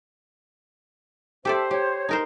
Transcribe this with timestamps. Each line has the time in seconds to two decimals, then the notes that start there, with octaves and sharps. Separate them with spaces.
1.45 D4 G4 A4 C5 D5 E5
1.71 G4 C#5
2.09 D#4 A#4 C5